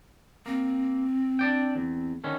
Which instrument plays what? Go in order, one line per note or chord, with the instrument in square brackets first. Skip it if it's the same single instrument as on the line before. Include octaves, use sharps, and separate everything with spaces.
[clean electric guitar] A#3 [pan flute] C4
[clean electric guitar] D4 D5 G5
E2
D3 D#3 C#4